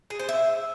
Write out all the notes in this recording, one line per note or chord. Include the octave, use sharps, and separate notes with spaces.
G#4
C5
E5